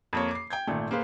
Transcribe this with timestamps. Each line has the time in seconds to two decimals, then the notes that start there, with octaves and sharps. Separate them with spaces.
0.13 F2 A#3 C#5
0.31 D6 C7
0.50 G5 G6 G#6
0.67 G#1 A#2 A3
0.91 A#3 G#4 B4 C5 F5